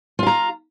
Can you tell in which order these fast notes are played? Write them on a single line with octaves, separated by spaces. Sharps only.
F4 F5 A#5